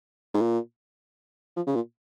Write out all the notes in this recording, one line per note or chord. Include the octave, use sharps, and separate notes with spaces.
G#2
A#2
F3
C#3
A#2